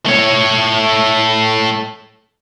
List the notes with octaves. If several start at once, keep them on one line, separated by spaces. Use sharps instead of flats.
A3 C#5